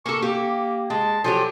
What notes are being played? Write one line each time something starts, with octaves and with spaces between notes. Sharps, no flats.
A#3 A4 C#6
A#3 G4
G#3 A5
F3 F#3 G4 A4